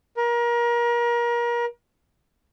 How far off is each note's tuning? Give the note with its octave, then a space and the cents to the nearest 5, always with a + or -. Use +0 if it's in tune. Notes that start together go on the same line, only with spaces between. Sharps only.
A#4 +30